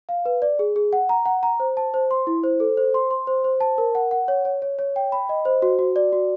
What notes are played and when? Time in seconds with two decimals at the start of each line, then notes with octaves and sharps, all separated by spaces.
0.09 F5
0.25 B4
0.42 D5
0.59 G#4
0.76 G#4
0.93 F#5
1.09 A#5
1.26 F#5
1.43 A#5
1.60 C5
1.77 A5
1.94 C5
2.11 C6
2.27 E4
2.43 C5
2.60 A4
2.77 C5
2.94 C6
3.11 C6
3.27 C5
3.44 C5
3.61 A5
3.78 A#4
3.95 F#5
4.11 F#5
4.28 C#5
4.45 C#5
4.62 C#5
4.79 C#5
4.96 G5
5.12 B5
5.29 D#5
5.45 C5
5.62 F#4
5.79 F#4
5.96 D5
6.13 F#4